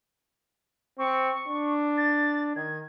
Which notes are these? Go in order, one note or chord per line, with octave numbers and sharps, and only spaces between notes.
C4 C#6
D4
A6
D#3 G#6